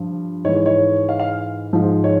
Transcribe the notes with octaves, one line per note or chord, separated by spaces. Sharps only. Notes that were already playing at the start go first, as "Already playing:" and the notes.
Already playing: G2 F3
G#2 E3 C#5
C#5
C#5
F5
F5
G#2 F3
C#5